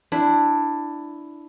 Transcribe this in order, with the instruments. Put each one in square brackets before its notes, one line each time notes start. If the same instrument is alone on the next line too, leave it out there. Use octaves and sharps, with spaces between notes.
[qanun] D4 E4